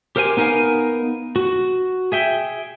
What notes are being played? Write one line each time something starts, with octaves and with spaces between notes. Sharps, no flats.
G4 A#4 C5 E5 G#5
B3 D#4 A#4 E5 F5 G#5
F#4
G#4 E5 G5